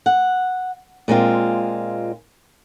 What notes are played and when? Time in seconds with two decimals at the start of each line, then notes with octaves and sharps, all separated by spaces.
0.06 F#5
1.08 A#2 G#3 C4 F4